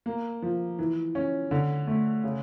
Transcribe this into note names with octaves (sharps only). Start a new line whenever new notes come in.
A#3
F3
E3
C#4
D3
A3
C#3